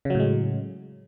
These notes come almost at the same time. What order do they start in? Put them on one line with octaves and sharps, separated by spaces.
C#3 F#3 A2 G#3